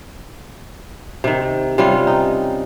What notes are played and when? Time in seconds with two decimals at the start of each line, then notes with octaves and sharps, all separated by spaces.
1.24 C3 D#3
1.78 C3 G3 C#4 F4
2.07 D#4